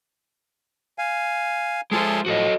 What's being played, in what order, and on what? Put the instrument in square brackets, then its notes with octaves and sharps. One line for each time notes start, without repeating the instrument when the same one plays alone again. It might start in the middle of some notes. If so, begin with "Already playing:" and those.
[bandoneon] F5 G#5
[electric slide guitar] G#3 F4 C5 [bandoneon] G#4 A4 C6
[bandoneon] A2 F3 [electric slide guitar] F#4 A4 D#5